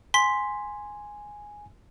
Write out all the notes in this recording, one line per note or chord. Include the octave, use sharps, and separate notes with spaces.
G#5 C6 B6